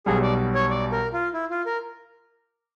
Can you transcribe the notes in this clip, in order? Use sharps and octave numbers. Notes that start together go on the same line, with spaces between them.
B1 B2 G3 G#4
D5
C#5
D5
A#4
F4
E4
F4
A#4